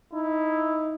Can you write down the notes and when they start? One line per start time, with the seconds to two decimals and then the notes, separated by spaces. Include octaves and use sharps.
0.13 D#4 E4